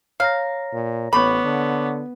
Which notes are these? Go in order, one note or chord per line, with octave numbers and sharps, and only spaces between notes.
C#5 F5 A#5 A#6
A#2
A1 B3 C#5 B5 C#6 D6
D3